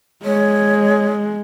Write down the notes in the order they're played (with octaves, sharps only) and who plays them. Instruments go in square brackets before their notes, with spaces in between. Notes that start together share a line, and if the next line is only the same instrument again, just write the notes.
[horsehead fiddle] G#3 [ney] C#5